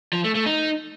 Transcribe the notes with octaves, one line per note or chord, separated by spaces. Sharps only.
F3
A3
A3
D#4